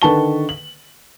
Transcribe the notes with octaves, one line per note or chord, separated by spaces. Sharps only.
D3 D#3 B4 A5 C#6 G7
F#7